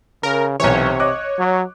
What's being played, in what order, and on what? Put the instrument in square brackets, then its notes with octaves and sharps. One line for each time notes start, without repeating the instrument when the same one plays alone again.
[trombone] C#3 [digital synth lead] A#4
[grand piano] B1 E3 [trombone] C3 [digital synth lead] C#5
[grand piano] D#5 D6 F#6
[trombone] F#3